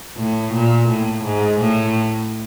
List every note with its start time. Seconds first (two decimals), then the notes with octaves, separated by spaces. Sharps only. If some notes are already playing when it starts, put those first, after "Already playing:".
0.17 A2
0.54 A#2
0.88 A2
1.24 G#2
1.60 A2